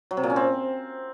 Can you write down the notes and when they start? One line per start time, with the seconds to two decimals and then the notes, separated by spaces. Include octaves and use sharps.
0.11 F#3
0.17 C3
0.23 A#2
0.30 C#4
0.36 C4